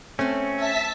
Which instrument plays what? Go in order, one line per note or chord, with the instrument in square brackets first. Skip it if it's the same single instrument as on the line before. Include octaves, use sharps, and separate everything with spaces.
[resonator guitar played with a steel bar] A3 C4 [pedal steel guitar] C#4
[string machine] E5 A5 B6